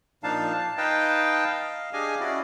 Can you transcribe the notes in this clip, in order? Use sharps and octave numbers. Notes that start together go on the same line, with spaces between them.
A#2 F3 D4 D#4 F5 A5
A5
D#4 B4 D#5 F5 G5 A5
D#5 F5
D4 G4 G#4 D#5 F5 G#5
C#4 E4 F#4 D5 D#5